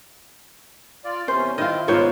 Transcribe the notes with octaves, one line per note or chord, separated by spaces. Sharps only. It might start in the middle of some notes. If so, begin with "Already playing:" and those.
F4 D5
E2 C3 C#4 C5
D#3 C4 E4 F4 D#5
G#2 B2 A#3 B3 F4 C5 C#5